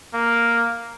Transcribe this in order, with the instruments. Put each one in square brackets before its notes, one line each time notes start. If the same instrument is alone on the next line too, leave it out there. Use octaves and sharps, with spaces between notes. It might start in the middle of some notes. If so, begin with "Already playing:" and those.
[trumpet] A#3